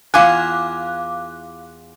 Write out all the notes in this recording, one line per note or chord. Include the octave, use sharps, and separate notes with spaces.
E2 F4 F5 G#5 D6 F#6